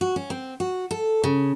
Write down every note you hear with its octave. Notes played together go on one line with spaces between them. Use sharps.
F#4
C#4
C4
F#4
A4
C#3